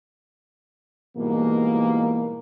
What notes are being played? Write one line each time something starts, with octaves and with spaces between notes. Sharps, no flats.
G#2 B2 E3 G3 A#3